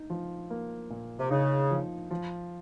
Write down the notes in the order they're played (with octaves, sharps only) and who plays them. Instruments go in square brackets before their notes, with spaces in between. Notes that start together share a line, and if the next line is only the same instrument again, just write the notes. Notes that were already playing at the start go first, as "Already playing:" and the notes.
Already playing: [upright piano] D#4
F3
A#3
A#2
[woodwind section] C3
[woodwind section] C#3 [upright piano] D#4
[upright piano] F3
F3